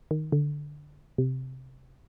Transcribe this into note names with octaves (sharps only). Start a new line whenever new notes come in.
D#3
D3
C3